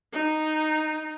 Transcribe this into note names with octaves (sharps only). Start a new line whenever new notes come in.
D#4